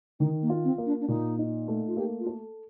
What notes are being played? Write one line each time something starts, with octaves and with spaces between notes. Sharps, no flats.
D#3 D#4
A#3
F4
C4
A#3
D4
D4
A#2 D#4
D#4
A3
F4
A#3 G4
F4
A4